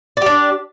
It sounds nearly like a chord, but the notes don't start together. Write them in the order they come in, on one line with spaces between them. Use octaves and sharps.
D5 G4 D4